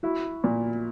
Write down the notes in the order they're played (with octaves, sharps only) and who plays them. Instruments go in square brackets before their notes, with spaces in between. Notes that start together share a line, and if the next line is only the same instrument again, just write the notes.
[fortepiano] E4 F#4
A#2